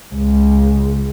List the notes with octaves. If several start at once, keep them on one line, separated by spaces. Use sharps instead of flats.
C#2